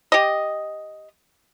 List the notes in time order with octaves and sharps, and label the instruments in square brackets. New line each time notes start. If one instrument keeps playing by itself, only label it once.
[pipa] G4 D#5